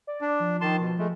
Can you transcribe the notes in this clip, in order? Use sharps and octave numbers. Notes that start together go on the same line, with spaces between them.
D5
D4
F3
D#3 A5 C6
B2
F3 G#3 A3